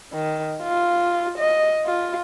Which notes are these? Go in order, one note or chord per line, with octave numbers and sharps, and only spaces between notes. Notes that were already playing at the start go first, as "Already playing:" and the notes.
D#3
F4
D#5
F4